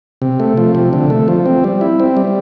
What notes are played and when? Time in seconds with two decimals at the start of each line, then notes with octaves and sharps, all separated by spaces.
0.22 C3
0.40 A3
0.57 F3
0.75 C3
0.93 D3
1.10 A3
1.28 F3
1.46 C4
1.64 G3
1.81 E4
2.00 C4
2.17 G3